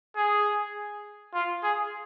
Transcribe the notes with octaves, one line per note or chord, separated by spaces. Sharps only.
G#4
F4
G#4